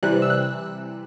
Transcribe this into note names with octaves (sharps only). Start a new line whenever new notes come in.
C3 E3 G3 F#6
E6
F#6